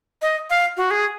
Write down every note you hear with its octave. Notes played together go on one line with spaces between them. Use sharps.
D#5
F5
F#4
G#4